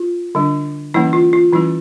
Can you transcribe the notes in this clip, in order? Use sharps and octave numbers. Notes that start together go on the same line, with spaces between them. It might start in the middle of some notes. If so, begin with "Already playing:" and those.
Already playing: F4
D3 G3 D4
E3 G3 A#3 C#4 E4
F4
F4
E3 G3 C#4 E4